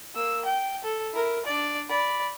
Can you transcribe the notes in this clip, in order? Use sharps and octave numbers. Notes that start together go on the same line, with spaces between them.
A#3 E6
G5
A4
E4 A#4
D4 D5
D5 B5